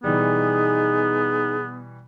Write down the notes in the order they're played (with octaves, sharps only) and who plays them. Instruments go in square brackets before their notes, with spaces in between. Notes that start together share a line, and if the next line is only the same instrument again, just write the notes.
[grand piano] B2 E3 G3 [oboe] B3 [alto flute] D#4 [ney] G#4